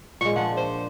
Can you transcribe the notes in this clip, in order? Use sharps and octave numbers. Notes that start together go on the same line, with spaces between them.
A#2 G#3 C#6
F3 D4 F#5
C5